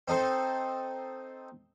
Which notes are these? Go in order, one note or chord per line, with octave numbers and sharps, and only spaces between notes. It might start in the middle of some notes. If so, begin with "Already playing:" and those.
C4 D#4 A4 C5